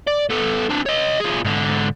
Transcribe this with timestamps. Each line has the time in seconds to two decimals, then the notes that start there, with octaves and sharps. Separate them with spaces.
0.07 D5
0.30 B3 A4
0.70 C4 D4
0.86 C#5 D#5
1.20 F3 G#4
1.44 G#2 D3